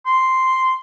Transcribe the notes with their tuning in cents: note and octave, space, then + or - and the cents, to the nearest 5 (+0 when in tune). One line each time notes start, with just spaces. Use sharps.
C6 -5